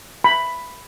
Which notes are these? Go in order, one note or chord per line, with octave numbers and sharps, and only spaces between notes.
B5